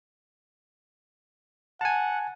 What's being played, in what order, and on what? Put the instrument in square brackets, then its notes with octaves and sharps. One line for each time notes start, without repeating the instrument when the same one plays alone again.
[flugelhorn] F#5 [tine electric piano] G#5 A5